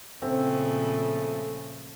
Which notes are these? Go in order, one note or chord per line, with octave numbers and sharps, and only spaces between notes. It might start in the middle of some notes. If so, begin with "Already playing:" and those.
A#2 C#3 F3 A3 C4